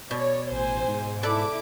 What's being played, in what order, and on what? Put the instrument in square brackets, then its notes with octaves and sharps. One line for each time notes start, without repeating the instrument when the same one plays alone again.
[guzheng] B2 [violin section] C#5 D5
[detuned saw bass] A1 [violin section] C5 G#5
[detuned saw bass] G#2
[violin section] E4 D6 [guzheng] A4 B4 D5